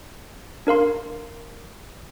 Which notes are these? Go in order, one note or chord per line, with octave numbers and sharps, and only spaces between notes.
D4 A#4 F5 C6